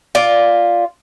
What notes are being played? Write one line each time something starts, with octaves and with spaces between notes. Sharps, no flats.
F4 D5